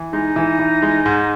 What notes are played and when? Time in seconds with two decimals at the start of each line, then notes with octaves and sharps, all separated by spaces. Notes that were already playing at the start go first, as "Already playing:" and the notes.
Already playing: E3
0.13 G#3 D#4
0.36 E3
0.59 E3
0.82 G#3
1.06 G#2